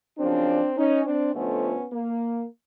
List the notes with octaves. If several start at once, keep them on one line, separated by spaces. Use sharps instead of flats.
F#2 C#3 F3 C4 D4
C#4 D#4
C4 D4
F2 D3 F3 A3 B3 C#4
A#3